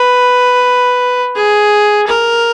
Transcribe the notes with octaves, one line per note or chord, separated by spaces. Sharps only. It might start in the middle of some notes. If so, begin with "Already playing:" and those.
Already playing: B4
G#4
A#4